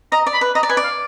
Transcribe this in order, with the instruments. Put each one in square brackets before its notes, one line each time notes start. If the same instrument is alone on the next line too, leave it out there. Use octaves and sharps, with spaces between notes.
[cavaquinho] D#5 [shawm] A#5
[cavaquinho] D5
[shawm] B5
[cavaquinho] B4
[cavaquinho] D#5 [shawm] A#5
[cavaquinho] D5
[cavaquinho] B4 [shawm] G#5
[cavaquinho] D5
[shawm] F5